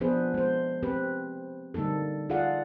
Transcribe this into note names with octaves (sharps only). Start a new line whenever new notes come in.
F3 B3 D4 G#4 B4 C5
G#3 C5
C4 G4 B4
D3 G3 A#3 D#4 A4
F4 G#4 A4 D5 F5 F#5